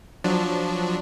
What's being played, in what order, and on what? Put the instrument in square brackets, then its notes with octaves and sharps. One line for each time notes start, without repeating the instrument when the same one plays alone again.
[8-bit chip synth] F3 F#3 D4